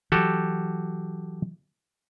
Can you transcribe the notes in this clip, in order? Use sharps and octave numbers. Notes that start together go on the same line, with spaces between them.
E3 F#3 F#4 G4 A4